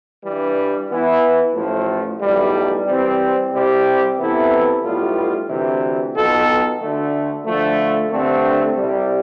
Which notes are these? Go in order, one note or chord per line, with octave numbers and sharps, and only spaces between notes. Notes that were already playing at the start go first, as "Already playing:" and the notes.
G2 E3 G3
E3 B3 E4
A1 A2 F3 A3
B1 A2 E3 G3
E3 G3 C4
C2 C3 G3 C4 G4
C3 E3 B3 E4 A4
B1 A2 G3 B3 F4
D2 C3 E3
B1 B2 B3 F4 A4
D2 D3 A3
D3 F3 A3
G2 D3 A3 C4
C2 C3 G3